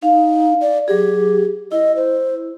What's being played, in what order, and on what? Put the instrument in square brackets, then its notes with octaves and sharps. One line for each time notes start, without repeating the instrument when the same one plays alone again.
[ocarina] D#4 [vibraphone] F5
[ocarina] D5
[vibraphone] F#3 G#4 [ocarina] G4
[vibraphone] E4 [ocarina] D#5
[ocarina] C5